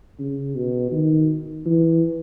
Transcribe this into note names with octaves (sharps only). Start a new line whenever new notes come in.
C#3
B2
D#3
E3